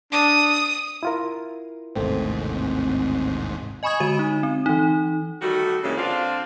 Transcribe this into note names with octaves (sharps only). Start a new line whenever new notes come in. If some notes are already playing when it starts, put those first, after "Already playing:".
D4 D#6
E4 F4 A#4
A1 D#2 G#2 C3 A3 C4
D#5 G#5 B5 C#6 D#6 G#6
D3 G#3 F#4 D#7 E7
D#4
C4
E3 D#4
D#3 G3 A3 F#4
G2 C#3 E3 G#3 A#3 C#4
D3 C4 D4 F4